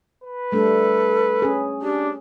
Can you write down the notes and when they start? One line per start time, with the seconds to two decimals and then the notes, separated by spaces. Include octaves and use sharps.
0.24 B4
0.52 G3 A3 D4 A4
1.42 C#4 G#4
1.82 D4 G4